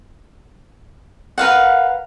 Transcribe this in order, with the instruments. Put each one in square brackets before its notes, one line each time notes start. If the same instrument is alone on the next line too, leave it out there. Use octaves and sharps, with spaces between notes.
[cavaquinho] A#4 B4 F5 F#5